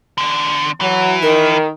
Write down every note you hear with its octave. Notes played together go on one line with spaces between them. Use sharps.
E2 D3
E3 F#3
D#3 A#4